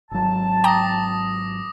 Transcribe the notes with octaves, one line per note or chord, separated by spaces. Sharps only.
G#1 F#3 A5
G5 A#5 D6 D#6 A#6